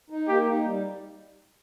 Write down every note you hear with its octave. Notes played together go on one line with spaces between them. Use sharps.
D#4
A#3 G4
D#4
G3